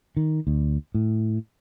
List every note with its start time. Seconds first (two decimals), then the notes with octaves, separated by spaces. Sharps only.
0.17 D#3
0.47 D2
0.95 A2